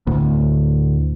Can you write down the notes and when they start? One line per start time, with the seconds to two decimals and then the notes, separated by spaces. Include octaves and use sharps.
0.07 D2 A2